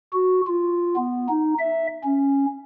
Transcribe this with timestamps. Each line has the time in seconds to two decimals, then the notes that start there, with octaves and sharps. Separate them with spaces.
0.13 F#4
0.47 F4
0.97 B3
1.28 D#4
1.59 E5
2.04 C#4